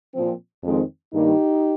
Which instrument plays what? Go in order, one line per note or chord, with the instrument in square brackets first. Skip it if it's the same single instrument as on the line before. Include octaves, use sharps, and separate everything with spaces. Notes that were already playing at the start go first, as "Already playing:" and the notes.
[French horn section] A#2 F3 C4
F2 D#3 G#3 C4
G2 D#3 G3 A#3 D#4 G4